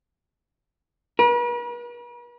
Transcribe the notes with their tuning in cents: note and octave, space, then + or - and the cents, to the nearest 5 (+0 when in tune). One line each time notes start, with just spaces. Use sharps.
B4 -45